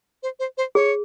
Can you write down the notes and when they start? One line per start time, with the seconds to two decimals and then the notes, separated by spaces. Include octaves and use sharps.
0.23 C5
0.40 C5
0.58 C5
0.75 G#4 C#5